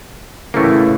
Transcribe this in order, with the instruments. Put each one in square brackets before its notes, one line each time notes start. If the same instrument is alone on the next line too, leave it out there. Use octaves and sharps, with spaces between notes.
[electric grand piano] A2 C#3 [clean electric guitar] E3 [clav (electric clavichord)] A3 A#3